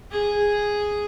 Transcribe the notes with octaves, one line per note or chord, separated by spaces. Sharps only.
G#4